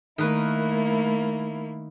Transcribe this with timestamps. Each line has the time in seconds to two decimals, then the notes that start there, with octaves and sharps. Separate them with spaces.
0.18 D#3 A3 A#3 E4 B4